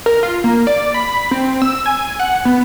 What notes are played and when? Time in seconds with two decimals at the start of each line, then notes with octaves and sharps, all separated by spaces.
0.06 A#4
0.23 F4
0.44 A#3
0.67 D5
0.94 B5
1.31 C4
1.62 E6
1.86 G#5
2.20 F#5
2.45 B3